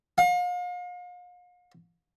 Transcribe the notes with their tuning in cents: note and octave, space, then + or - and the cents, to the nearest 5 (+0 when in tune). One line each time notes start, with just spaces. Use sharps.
F5 +40